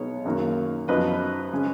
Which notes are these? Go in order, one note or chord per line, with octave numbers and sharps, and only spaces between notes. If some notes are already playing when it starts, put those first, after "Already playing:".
Already playing: B1 B2 G#3 B3 D#4 C#5
F#2 D#3 A#3
F#2 F3 B3 D#4 B4 D#5
C#3 G#3 C#4